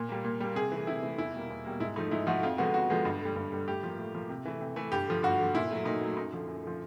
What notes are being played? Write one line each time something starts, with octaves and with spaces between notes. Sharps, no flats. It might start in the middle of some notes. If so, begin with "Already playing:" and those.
Already playing: A#2
G3 A#3
A#2
G3 A#3
C3 G#4
E3 A3
C3 E4
E3 A3
E2 E4
B2 G3 A#3
E2
B2 G3 A#3
G#2 E4
F3 A3 D#4
G#2 E4
F3 A3 F#4
F2 F4
D3 F3 G#3 B3 F#4
F2 F#4
D3 F3 G#3 B3
G2
D3 G3
G2
D3 G3
A2 G4
F3 A#3
A2
F3 A#3
C3
E3 A3
C3
E3 A3
G2 G4
D3 F3
G2 F#4
D3 F3
A#2 E4
F#3 A3
A#2 D#4
F#3 A3
F#2 D#4
D3 F3
F#2
D3 F3